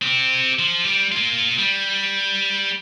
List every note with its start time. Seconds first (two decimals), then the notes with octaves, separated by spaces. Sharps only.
0.02 C4 G4
0.59 F3
0.84 G3 G4
1.12 A#3 F4
1.58 G3